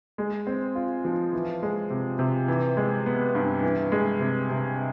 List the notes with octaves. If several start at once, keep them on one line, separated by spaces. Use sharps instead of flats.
G#3
C4
F4
F3
E3
G#3
C3
C3
E3
G#3
B3
G2
E3
G#3
C3
C3